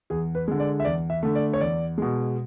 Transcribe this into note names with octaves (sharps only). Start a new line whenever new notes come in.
E2 G#4
B4
D3 G#3
D5
E5
E2 D5
E5
D3 A3
D5
C#5
E2 D5
B2 G#3